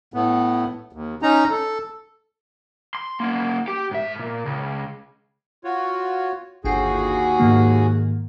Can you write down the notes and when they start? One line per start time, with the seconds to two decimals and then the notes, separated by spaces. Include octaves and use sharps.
0.14 A2 B3
0.93 D#2
1.22 C#4 D#4 A#5
1.50 A4
2.95 C6
3.20 A#3 C#4
3.68 G4
3.91 G#2 E5
4.19 A#2
4.45 C#2
5.64 F4 F#4 C#5
6.65 G1 D#2 F#4 G#4 G5 C7
7.40 G#2 D#3 A#3